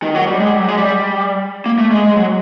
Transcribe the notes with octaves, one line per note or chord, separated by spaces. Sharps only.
D#3
F#3
G3
G#3
G3
F#3
G#3
G3
A#3
A3
G#3
G#3
F#3